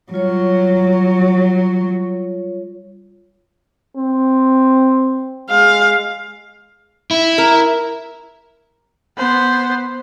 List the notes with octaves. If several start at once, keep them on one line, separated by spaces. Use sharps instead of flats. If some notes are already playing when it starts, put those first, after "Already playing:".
F#3 G3 F4 C#5
C4
G#3 F5
E4
A#4
B3 C5